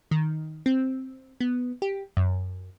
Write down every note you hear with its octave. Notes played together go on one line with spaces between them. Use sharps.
D#3
C4
B3
G4
F#2